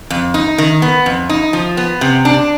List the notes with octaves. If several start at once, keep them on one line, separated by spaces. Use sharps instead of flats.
F2
D#4
D#3
B3
F2
D#4
F3
B3
C3
D4